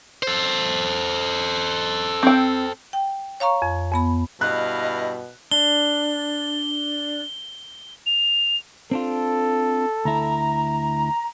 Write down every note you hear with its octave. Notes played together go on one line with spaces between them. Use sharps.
A4 C5
C4 G5
G5
C#5 F5 A#5 C#6
F2
F2 B3 B5
G2 B2 E4 D#5 F5 F#6
D4 G7
F7
C4 D4 F4 A4
D2 E4 A#5